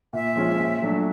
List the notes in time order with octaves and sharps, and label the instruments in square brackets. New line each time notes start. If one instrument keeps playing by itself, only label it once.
[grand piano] A#2 [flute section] E5
[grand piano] F3 G#3 C#4 F4
A#2
F#3 A3 D4